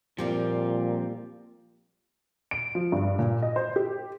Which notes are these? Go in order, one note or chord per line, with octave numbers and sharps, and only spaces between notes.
A#2 F3 G3 A#3 C4 F4
D7
F3
G2
A#2
D#5
C5
G4